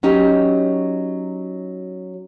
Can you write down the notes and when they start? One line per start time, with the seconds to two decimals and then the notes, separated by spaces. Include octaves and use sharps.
0.03 F#3 C#4 D#4 G4